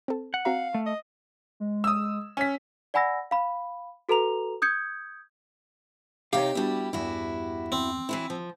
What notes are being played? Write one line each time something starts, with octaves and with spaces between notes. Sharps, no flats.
C4 A4
F#5
C4 F#4 F5 A#5
A3
D#5
G#3
D#6 E6
C#4 B6
D5 F#5 G#5 B5 E6 A#6
F5 B5
F#4 A4 B4 A#5 F7
D#6 G6 G#6 C#7
C3 D#4 G4 C#5 D#5 F5
G3 B3 D4 E4 F#4
E2 G2 E4 F#4
C4
E3 F#3 E4
F3